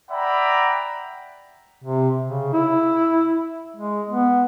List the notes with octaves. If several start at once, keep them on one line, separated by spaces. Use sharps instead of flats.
D5 E5 F#5 G5 A#5 B5
C3
C#3
E4
G#3
B3